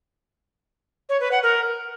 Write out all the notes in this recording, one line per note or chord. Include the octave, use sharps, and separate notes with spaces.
C#5
B4
F#5
A#4